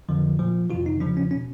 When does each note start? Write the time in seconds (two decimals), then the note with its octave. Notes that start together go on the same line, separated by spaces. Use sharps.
0.09 F2 D3 F3
0.39 A#2 F3
0.70 F2 C3 E3 F4
0.86 D#4
1.00 E2 C#3 F3 D4
1.17 C#4
1.31 B2 C#4